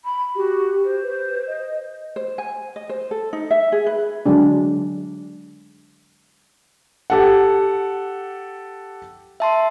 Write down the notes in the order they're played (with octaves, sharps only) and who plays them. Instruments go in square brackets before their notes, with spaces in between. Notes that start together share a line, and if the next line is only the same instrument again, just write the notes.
[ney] B5
[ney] F#4 [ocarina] G4
[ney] C5
[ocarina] B4
D#5
[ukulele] C5
G#5
D#5
C5
A4
D#4
E5
G#4
B4
[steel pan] D3 F#3 G#3 D4
[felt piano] G4 A4 F#5
[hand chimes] E5 A5 C6